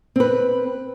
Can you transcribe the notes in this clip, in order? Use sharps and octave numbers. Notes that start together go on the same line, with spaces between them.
C4 B4